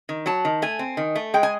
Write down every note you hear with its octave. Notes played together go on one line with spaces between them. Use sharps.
D#3
F#3 A5
D#3
A3 G#5
C4
D#3
A3
G#3 G5
G#5